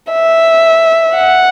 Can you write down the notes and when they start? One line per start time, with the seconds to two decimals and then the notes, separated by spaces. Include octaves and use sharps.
0.11 E5
1.15 F#5